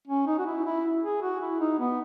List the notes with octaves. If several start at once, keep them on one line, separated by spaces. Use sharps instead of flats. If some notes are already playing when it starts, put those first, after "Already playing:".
C#4
D#4
F#4
E4
E4
G#4
F#4
E4
D#4
B3